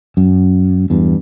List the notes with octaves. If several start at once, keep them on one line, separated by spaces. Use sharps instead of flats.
F#2
E2 G2